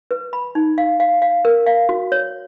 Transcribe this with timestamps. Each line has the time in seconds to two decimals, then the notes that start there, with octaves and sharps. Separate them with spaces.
0.11 B4
0.33 B5
0.55 D#4
0.78 F5
1.00 F5
1.22 F5
1.45 A#4
1.66 F5
1.89 F#4
2.12 C#5